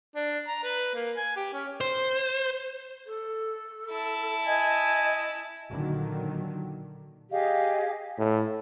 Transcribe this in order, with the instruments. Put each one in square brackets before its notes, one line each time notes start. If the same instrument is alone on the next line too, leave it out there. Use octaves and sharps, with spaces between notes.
[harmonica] D4
A#5
B4
A#3
G#5
G4
C#4
[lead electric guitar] C5
[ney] A4
[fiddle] E4 A5
[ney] D#5 [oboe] G#5
[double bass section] A#2 D3 D#3 F#3
[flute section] G4 G#4 D#5 F5
[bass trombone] A2